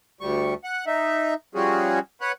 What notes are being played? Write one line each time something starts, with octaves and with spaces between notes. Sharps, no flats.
D2 G3 C#6
F#5
D#4 E5
F3 G3 C#4 F#4 G#4
B4 C#5 F#5